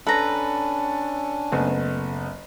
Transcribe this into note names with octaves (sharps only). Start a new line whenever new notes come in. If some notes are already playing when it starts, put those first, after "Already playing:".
C#4 D4 A4 B4 A#5
F#1 A3 B3